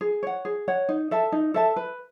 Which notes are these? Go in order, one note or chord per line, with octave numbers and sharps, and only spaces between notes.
G#4
C#5 F#5
G#4
C#5 F#5
D#4
A4 E5 A5
D#4
A4 E5 A5
B4